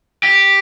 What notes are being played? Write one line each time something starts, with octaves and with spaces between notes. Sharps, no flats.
G4